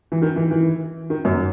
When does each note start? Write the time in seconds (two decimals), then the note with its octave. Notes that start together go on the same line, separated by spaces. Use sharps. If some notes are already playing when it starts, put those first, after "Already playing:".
0.12 E3
0.22 D#3
0.36 E3
0.51 E3
1.10 D#3
1.25 F#2 F#3